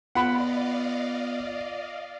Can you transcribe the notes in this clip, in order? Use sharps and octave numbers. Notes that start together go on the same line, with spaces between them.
B3 F4 D5 D#5 F5 F#5 B5